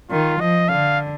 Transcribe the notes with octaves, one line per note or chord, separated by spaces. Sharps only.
D#3 F4
F3 D#5
D3 F5